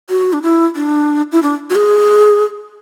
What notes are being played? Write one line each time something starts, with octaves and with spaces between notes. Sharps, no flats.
F#4
D4
E4
D4
E4
D4
F#4
G#4